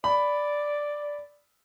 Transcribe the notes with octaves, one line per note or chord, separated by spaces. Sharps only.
D5 B5